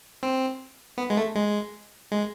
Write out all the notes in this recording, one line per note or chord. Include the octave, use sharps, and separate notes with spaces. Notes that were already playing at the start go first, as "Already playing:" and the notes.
C4
B3
G#3
A3
G#3
G#3